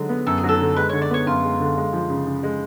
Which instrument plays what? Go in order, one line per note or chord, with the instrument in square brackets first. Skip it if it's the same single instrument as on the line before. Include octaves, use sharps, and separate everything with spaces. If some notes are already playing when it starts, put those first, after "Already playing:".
Already playing: [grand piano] D3 F#3 G#3
B3
[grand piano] F#2 [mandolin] A4
[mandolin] G#4
[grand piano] F#3
[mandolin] A4
[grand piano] D3
[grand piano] G#3 [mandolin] B4
[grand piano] D3 [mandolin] C#5
[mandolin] D5
[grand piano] B3 [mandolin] C#5
[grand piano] F#2 [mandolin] F4
[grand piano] G#3
D3
G#3
F3
C#3
C#3
G#3